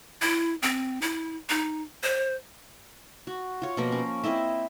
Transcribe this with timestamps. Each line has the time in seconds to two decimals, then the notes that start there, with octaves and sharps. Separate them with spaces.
0.22 E4
0.62 C4
1.02 E4
1.49 D#4
2.03 C5
3.27 F#4
3.62 F4 C#5
3.77 B2 F3 A#3 A#5
3.92 C#4
4.24 C4 E4 D#5 E5